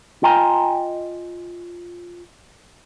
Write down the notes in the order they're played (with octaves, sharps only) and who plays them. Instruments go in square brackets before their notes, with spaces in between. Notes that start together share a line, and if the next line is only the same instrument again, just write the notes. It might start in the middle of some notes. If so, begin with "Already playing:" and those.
[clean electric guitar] F4 D#5 G5 G#5 A#5